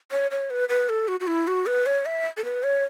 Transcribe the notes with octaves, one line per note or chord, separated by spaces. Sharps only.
C#5
C#5
B4
B4
A4
F#4
F#4
E4
F#4
B4
C#5
E5
A4
B4
C#5